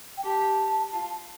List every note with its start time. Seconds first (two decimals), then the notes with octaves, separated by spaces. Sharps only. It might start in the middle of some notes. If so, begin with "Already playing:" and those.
0.17 G5
0.24 G4 A5
0.92 F4